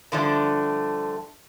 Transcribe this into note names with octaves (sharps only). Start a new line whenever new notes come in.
G2 D3 F3 A3 D4